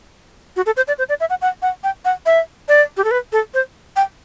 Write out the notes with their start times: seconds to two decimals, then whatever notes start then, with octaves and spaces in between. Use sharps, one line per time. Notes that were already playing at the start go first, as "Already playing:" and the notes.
0.56 F#4
0.66 A4
0.77 C5
0.88 D5
0.98 C5
1.09 D5
1.20 E5
1.30 F#5
1.42 F#5
1.62 F#5
1.84 G5
2.05 F#5
2.26 E5
2.68 D5
2.97 G4
3.04 A4
3.11 B4
3.32 A4
3.54 C5
3.96 G5